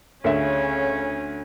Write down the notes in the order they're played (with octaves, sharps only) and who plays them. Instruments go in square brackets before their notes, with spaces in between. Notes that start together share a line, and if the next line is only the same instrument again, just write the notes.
[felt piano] D2 E5 [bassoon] C#3 [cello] C#4